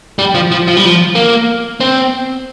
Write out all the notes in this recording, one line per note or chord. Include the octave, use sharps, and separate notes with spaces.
G3
F3
F3
F3
G3
F3
A#3
C4